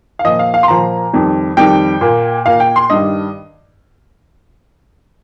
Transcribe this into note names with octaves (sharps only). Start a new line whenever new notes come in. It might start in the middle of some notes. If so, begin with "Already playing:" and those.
F5
A#2 F3 A#3 D#5
F5
F5
C6
A#2 F3 A#3 A#5
F2 D#3 G3
F2 D#3 G3 G5
A#2 A#3
A#2 A#3 F5
G5
C6
G2 D#3 G3 D#5